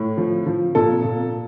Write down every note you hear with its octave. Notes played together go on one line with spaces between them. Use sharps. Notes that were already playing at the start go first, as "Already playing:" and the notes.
Already playing: A2
F3
F3
A#2 A4
A#2